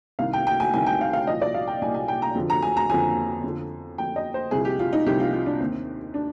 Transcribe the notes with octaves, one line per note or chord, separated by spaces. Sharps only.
C2 C3 D#3 F5
G5
G5
G#5
C2 C3 D#3 G#5
G5
F5
F5
C2 A#2 F3 D#5
D5
F5
G5
C2 A#2 F3 G#5
G#5
G5
A#5
F2 D3 F3
A#5
G#5
A#5
F2 D3 F3 G#5
F2 D3 F3
F2 D3 F3 G5
D#5
C5
C2 C3 F3 G#4
G4
F4
D#4
C2 C3 F3 G4
F4
F4
D4
D#2 D#3 C4
D4